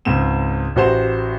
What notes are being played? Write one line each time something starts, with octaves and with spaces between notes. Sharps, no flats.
C#2 G#2 C4 E7
A1 F#4 G4 C5 A#5 E7